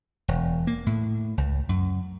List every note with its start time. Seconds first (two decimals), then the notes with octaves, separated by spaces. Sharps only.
0.28 E1
0.67 A#3
0.86 A2
1.38 C#2
1.69 F#2